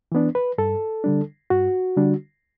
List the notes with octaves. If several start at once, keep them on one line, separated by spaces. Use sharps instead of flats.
E3 B3 D4
B4
G2 A4
D3 G3 D4
G2 F#4
D3 G3 D4